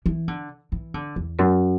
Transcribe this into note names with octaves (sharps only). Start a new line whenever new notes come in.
E3
D3
E3
D3
E2
F#2